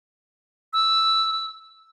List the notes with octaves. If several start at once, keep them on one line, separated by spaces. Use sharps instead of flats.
E6